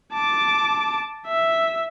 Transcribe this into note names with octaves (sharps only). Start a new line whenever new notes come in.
A5 D6
E5